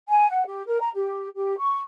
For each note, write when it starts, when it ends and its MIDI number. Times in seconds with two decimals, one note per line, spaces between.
0.08 0.25 80
0.29 0.43 78
0.46 0.62 67
0.66 0.78 70
0.80 0.89 82
0.94 1.26 67
1.34 1.55 67
1.58 1.80 85